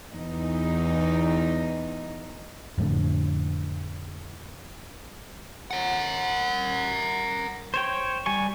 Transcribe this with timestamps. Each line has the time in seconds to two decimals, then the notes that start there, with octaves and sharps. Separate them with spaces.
0.12 E2 D#4
2.78 F2 A2 D3
5.71 A#4 F#5
7.74 C5 C#5 G5
8.26 G3 G#5 C#6